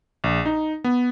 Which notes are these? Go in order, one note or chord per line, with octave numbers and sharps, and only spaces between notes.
A#1
D#4
B3